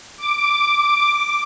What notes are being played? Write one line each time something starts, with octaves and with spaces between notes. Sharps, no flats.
D6